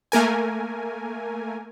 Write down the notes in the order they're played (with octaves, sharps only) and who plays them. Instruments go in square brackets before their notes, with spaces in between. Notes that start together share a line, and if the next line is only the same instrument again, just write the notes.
[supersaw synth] A3 A#3 A#4 G#5